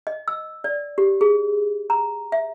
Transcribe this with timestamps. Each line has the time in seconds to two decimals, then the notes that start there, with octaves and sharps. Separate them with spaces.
0.07 D#5
0.28 E6
0.64 D5
0.98 G4
1.21 G#4
1.90 A#5
2.32 E5